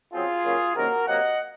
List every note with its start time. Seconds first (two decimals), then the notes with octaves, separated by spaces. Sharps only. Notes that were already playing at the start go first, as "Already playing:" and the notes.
0.13 C#3 F#3 C4 F4 G#4
0.45 C#3 F#3 A#3 C#4
0.75 C3 D#3 F#3 A#3 C#4 F#4 A#4
1.07 C3 F#3 A#3 D#5 F#5